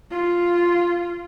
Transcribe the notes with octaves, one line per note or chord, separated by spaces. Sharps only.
F4